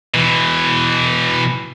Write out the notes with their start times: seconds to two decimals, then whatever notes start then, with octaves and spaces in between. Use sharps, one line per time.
0.14 B2 E3